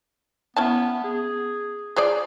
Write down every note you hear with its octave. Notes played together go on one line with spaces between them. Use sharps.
B3 C#4 E4 A5
G#4
F3 G#4 D5